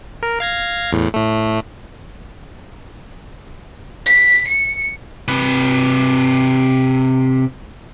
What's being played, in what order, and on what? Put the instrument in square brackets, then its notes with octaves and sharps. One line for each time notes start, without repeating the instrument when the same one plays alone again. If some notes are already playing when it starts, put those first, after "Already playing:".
[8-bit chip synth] A#4
F5 G#6 A#6
E2 A2
A2 A3
[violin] B6
C#7
[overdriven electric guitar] C3 B4